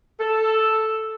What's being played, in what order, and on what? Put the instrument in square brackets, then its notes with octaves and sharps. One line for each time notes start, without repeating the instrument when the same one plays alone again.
[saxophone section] A4